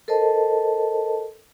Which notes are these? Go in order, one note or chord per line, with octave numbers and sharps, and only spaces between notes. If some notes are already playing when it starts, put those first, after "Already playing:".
A4 A#4 C5 D#5 A5